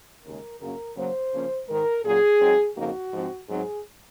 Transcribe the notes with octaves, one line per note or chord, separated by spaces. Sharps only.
D#2 C#3 G#3 A#4
F#2 C#3 F#3 A#3 C#4 A#4
C#3 F#3 A#3 C5
C#3 F3 A#3 C#4
G#2 D#3 G#3 A#4
A#2 F#3 A#3 C#4 G#4
G#2 F#3 C4 D#4
F2 C#3 F3 A#3 D#4 F#4
G#2 F3 G#3 C4
G#2 F#3 C4 D#4 G#4